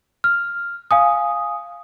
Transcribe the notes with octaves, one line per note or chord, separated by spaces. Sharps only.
F6
F5 G#5 D#6